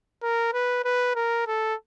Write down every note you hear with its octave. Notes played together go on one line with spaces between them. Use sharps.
A#4
B4
B4
A#4
A4